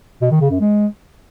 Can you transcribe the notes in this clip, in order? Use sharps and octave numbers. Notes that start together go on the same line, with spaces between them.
B2
D#3
C#3
F#2
G#3